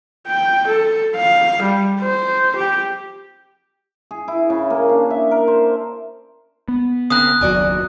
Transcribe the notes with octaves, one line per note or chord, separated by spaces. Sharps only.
G5
A4
F5
G3
C5
G4
G#4
E4
C#3
A#3
D4
E5
A#4
C5
B3
C#3 A#3 C4 D#6 F#6
F#1 D#2 F#3 F#4 D5 G#5